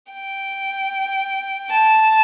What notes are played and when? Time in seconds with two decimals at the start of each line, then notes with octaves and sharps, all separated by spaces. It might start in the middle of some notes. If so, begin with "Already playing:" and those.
0.12 G5
1.71 A5